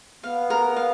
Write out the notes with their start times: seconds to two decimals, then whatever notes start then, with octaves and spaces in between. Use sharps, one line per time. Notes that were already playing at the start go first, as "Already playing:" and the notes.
0.23 B3 F5
0.50 A#4
0.76 F5